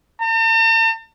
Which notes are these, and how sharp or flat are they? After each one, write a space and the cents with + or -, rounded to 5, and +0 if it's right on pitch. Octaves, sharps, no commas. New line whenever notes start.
A5 +45